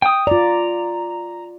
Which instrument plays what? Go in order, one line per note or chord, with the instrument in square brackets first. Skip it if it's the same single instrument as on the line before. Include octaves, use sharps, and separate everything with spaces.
[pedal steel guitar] G5 D#6
[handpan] F4 D5 [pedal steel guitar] A#5